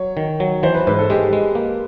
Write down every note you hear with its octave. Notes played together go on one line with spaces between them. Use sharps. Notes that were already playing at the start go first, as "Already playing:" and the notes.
Already playing: F#3 C#5
D#3
F#3
E3 C5
B4
G#2 B4
A4
G#3 G4
G#3
A#3